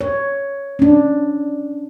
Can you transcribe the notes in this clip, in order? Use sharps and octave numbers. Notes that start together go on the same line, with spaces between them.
C#5
C#4 D4